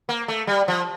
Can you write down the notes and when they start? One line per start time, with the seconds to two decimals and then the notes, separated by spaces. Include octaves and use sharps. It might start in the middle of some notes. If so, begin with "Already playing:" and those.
0.09 A#3
0.28 A3
0.47 G3
0.68 F3